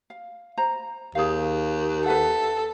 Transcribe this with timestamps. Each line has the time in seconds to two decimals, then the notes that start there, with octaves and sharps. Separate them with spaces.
0.10 F5
0.58 C5 A#5
1.15 D#2 G#4 F5
2.06 A4 B4 E5 F#5